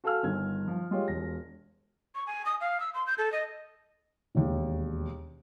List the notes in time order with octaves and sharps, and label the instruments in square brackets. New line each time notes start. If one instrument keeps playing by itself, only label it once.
[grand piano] F#4 A4 F5 G#5 E6 F6
G1 D#3 G#6
F3
G#3 F4 G4 C#5
E1 A#6
[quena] C#6
G#5
D#6
F5
E6
C6
G6
A4
D#5
[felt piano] E1 D#2